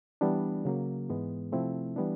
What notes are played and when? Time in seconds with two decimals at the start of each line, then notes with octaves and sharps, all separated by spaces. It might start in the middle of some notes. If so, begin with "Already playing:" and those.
0.21 E3 G3 B3 D4
0.65 C#3 F#3 A#3
1.10 G#2 E3 G#3 B3
1.52 C3 F3 A3 C4 E4
1.96 E3 G3 B3 D4